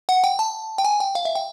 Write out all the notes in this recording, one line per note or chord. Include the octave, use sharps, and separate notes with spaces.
F#5
G5
A5
G5
G#5
G5
F5
E5
G5